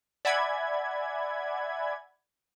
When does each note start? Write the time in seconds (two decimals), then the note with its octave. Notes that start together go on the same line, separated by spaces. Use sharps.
0.25 D5 E5 F#5 G#5 B5 G#6